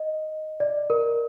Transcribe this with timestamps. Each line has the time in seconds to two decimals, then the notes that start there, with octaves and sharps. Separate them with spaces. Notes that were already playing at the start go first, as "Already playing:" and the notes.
Already playing: D#5
0.60 D5
0.90 A#4